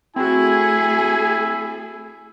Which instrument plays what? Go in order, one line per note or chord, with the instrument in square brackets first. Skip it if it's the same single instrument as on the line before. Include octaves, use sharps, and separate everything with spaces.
[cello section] A3 G#4 A4 [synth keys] C4 F#4 [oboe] E4 [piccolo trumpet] G#5